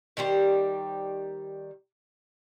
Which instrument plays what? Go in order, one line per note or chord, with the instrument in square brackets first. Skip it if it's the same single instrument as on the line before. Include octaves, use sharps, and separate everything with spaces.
[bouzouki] D#3 G3 G4 C5